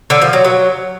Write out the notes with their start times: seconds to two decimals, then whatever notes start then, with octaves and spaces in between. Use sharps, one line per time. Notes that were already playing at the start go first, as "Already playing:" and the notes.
0.10 D3
0.22 F3
0.33 F#3
0.44 F#3